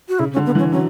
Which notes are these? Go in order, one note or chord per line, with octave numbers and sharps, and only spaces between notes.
F#4
C#3 E4
C#4
D3
B3
E3
C#4
F#3 C#4